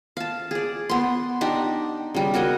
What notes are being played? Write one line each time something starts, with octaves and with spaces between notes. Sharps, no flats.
F5 A5
G#4 D5
B3 C6
D4 D#4 G4
C#3 G3
F#4 A#4 C#5 D#5